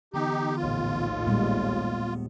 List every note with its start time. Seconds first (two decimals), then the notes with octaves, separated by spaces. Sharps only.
0.14 D3 E3 B3 D#4 G4
0.57 A#1 D#2 A2 F4
1.27 A#2 G3 G#3 B3